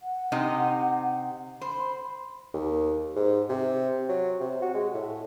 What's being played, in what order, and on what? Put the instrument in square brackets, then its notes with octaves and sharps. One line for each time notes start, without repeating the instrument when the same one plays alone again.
[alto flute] F#5
[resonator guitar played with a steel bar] C3 D#4 D#5
[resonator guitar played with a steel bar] C5 [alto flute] B5
[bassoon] D#2
G#2
C3
F#3
C3
F#4
G#3
A2